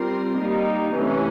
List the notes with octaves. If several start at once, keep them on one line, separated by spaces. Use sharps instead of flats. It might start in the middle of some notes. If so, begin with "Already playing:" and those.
Already playing: G3 C4 F4 A#4
G3 A#3 D#4
C3 E3 A3 C#4